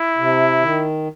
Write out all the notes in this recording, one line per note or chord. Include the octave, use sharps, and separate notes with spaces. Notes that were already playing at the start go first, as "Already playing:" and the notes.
Already playing: E4
C3
D#3